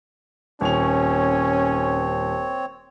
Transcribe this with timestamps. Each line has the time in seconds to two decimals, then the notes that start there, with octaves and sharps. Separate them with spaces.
0.61 D#1 C4 C#4 C#5 C#6 F7